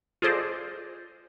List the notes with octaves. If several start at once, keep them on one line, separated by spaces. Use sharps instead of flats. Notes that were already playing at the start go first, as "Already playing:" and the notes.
F4 G#4 A4 C5 D5 D#5